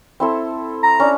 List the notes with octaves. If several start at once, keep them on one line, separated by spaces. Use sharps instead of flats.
C4 E4 A4
A#5
C#4 D4